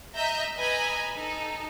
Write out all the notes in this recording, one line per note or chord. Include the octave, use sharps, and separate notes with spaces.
D#5 E5 A#5 G6 A#6
B4 D#5 G#5 A#5 B5 E6
D#4 A4